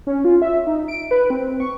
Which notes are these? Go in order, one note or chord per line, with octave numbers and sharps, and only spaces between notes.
C#4
F4
E5
D#4
D7
B4
C4
C#6